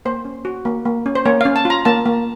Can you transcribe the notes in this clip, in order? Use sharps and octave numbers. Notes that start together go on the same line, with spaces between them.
A#3 C5
C#4
F#4
A#3
A#3
C#4
C5
A#3 C#5
C#4 F5
A5
F4
A#5
A#3 A5
A#3